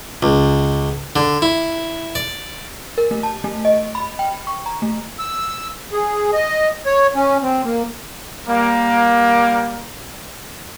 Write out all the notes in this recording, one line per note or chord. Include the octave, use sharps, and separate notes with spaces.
C#2
D3
E4
D5
A#4
A3
A5
A3
D#5
B5
G5
C#6
A#5
A3
E6
G#4
D#5
C#5
C#4
C4
A#3
G3 A#3